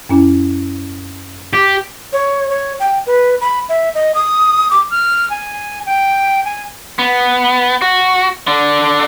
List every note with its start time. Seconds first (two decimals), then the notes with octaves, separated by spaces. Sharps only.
0.09 F#2 C#4 E4
1.54 G4
2.13 C#5
2.50 C#5
2.80 G5
3.06 B4
3.41 B5
3.69 E5
3.95 D#5
4.15 D#6
4.71 D6
4.91 F6
5.30 G#5
5.86 G5
6.45 G#5
6.99 B3
7.82 F#4
8.47 D3 D4